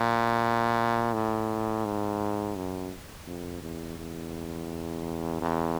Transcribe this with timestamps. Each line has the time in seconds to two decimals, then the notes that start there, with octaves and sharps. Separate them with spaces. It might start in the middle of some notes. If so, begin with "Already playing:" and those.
Already playing: A#2
1.13 A2
1.85 G#2
2.56 F#2
3.27 F2
3.63 E2
3.98 E2
5.41 E2